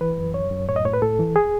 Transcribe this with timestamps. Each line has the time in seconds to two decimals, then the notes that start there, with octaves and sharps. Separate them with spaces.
0.01 E3 B4
0.18 F#2
0.34 F#2 C#5
0.51 F#2
0.68 A2 C#5
0.76 D#5
0.85 A2 C#5
0.93 B4
1.02 A2 A4
1.19 E3
1.36 G#4